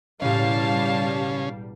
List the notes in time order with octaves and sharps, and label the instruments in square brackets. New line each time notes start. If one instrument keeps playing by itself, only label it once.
[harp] E1 A2 [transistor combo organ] C#3 C#4 [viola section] G3 [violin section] F5 A5